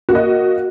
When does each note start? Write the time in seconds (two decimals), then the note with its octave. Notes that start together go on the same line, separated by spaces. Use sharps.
0.09 F#4
0.12 A#3
0.15 D#5